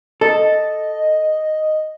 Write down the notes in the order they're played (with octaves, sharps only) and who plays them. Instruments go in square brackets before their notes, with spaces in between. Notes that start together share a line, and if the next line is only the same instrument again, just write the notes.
[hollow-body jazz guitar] A4 [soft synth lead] D#5